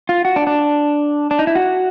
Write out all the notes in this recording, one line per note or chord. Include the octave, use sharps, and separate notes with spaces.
F4
F#4
D4
D4
D4
D#4
E4
F#4